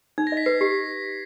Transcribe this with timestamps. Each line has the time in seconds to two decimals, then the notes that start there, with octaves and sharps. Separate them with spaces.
0.18 D#4 G#6
0.27 A#6
0.32 D#5
0.37 B6
0.46 B4 C7
0.61 G4 C7